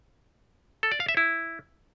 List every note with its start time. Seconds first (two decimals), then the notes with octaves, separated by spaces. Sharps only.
0.83 A4
0.92 D5
1.00 F5
1.09 E5
1.17 E4